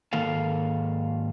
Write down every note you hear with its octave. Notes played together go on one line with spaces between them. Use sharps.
G#2 D#3 A#3 A4 F5